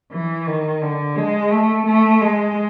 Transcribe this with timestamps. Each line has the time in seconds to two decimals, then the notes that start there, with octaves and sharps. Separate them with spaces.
0.12 E3
0.47 D#3
0.81 D3
1.16 G#3
1.51 A3
1.86 A3
2.21 G#3